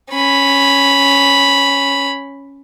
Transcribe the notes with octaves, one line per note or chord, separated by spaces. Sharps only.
C#4 B5